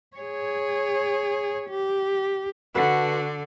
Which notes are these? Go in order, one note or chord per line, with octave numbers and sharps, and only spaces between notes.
G#4 C#5
G4
D3 F#4 A4 B4